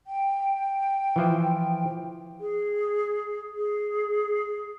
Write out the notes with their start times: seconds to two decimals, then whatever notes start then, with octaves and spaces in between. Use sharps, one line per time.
0.07 G5
1.16 E3 F3 C5
2.40 G#4
3.57 G#4